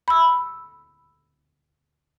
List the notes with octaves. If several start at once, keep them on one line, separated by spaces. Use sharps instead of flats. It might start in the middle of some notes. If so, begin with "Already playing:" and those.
B5 E6